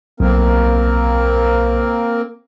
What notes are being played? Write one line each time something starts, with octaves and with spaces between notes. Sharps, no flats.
B1 A#3 C4 A#4